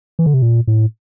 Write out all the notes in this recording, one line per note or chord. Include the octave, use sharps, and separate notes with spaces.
E3
D3
C3
A#2
A2